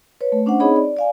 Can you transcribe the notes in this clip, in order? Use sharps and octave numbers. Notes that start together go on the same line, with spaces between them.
B4 C#5
A3
C#4 D4 C5 F#5
C4 D#4 G#4 C#5 D#5 B5
D5
D5 F5 G#5